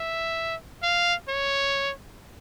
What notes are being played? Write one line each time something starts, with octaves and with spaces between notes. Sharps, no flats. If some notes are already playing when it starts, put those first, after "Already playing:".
Already playing: E5
F5
C#5